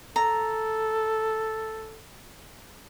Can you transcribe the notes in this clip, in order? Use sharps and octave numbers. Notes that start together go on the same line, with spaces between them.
A4 A#5